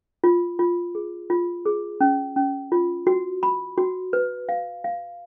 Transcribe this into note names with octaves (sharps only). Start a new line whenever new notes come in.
F4
F4
G#4
F4
G#4
C#4
C#4
F4
F#4
B5
F#4
B4
F5
F5